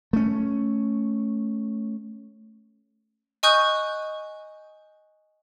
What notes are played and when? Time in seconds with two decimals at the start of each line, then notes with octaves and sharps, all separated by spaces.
0.13 A3 C#4
3.43 D#5 G#5 C#6 D#6 F#6 G6